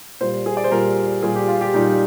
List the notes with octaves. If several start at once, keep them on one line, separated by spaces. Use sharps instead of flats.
A#2 G3 C5
G#4
D5
C5
A#2 G3 A#4
A#2 G3 G#4
G4
F4
G4
A#2 G3 D#4